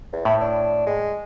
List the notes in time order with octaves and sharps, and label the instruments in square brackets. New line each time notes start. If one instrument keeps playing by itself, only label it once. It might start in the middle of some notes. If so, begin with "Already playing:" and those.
[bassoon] E2
[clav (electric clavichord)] A2 [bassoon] E4
[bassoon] D4
G#3